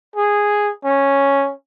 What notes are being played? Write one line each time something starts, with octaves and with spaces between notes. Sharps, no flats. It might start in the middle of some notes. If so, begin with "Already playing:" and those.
G#4
C#4